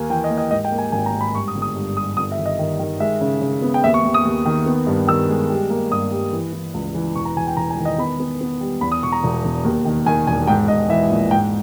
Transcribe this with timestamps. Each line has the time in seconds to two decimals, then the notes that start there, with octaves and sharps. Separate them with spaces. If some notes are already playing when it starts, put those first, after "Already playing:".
Already playing: D#2 A#3 G#5
0.10 E3 G5
0.24 D#5
0.30 A#3
0.38 D#5
0.51 G#2 D#5
0.65 G5
0.72 A#3
0.78 G#5
0.92 G#1 G#5
1.06 A#5
1.13 G#2
1.21 B5
1.34 G2 C#6
1.48 D#6
1.56 G1
1.62 D#6
1.76 G2
1.96 G3 D#6
2.17 G1 D#6
2.32 E5
2.38 D#3
2.46 D#5
2.59 D#3
2.79 D#3
3.00 G#3 E5
3.21 C#3
3.41 C#3
3.62 B3
3.74 G5
3.84 D#2 E5
3.94 C#6
4.04 D#2
4.14 D#6
4.25 D#2
4.46 D#3
4.66 B3
4.87 G2
5.07 D#3 E6
5.29 G#3
5.50 G3
5.70 A#3
5.91 G2 D#6
6.11 G3
6.33 E3
6.53 E3
6.74 C#2
6.95 E3
7.15 E1 C#6
7.25 A#5
7.37 E1 G#5
7.47 G5
7.57 E1 A#5
7.70 G#5
7.79 D#3
7.85 D#5
7.98 B3 B5
8.20 B3
8.41 B3
8.60 G3
8.81 E2 B5
8.92 D#6
9.03 E1 C#6
9.12 A#5
9.23 E1
9.45 E1
9.64 D#2
9.85 D#3
10.06 D#3 G#5
10.27 E1 G#5
10.47 G#2 G5
10.68 G#2 D#5
10.89 E3 E5
11.10 A#1
11.31 G#2 G5